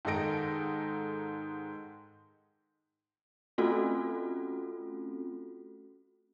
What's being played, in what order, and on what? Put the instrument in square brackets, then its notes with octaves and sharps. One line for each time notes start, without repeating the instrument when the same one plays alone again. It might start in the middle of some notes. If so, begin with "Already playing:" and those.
[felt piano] G#2 D#3 D#4 A4 A#6 D7
[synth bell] A3 C4 C#4 F4 F#4 A4